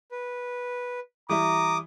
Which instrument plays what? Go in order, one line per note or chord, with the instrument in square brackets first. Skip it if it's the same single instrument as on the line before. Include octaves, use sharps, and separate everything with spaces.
[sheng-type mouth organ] B4
[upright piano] E3 G3 E4 [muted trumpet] A#5 [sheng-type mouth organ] D6 D#6